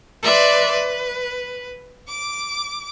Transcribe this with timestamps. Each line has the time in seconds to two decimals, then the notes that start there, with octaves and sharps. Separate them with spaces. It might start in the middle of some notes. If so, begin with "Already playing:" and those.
0.22 B4 D5 E5 C6
0.72 B4
2.08 D6